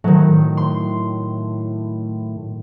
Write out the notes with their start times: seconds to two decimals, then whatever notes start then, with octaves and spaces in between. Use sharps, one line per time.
0.04 A2 D#3 F#3
0.57 C6